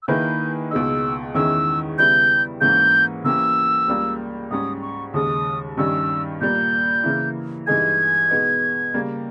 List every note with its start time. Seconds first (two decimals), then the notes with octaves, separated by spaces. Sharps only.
0.03 E6
0.08 D#3 A#3 E4 G#4 B4 G6
0.71 C#2 B2 G#3 D#4 E6
1.35 E2 D#3 G#3 C#4 E4 E6
1.98 C#3 G3 B3 E4 G6
2.61 G#2 E3 A#3 C#4 G6
3.25 E3 A#3 C#4 G4 E6
3.88 C#2 C#3 G3 A#3
4.50 G#2 G3 C#4 D#6
4.82 C#6
5.14 D#2 C#3 G#3 D#6
5.77 G2 D#3 G3 C#4 E6
6.41 A#2 G3 A#3 G6
7.03 C#3 E3 A#3 E4
7.67 G2 E3 G#3 D#4 G#4 G#6
8.30 B2 G#3 B3 D#4
8.94 C#3 G3 A#3